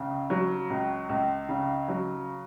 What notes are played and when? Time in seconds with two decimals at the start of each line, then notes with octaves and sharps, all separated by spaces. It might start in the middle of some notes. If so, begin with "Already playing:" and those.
Already playing: C#2 C#3
0.30 F#3
0.70 C#2
1.09 C#2
1.49 C#3
1.88 F#3